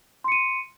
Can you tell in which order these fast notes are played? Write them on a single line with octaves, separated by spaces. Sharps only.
C6 C#7 D#7